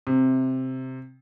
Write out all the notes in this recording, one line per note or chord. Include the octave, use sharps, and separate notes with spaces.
C3